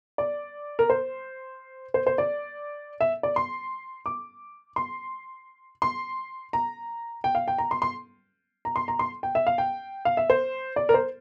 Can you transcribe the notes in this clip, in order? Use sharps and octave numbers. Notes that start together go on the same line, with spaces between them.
D5
A#4
C5
C5
C5
D5
E5
D5
C6
D6
C6
C6
A#5
G5
F5
G5
A#5
C6
C6
A#5
C6
A#5
C6
G5
E5
F5
G5
F5
E5
C5
D5
A#4
C5